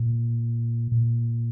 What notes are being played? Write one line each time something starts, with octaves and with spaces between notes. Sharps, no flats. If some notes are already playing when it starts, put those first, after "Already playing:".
Already playing: A#2
A#2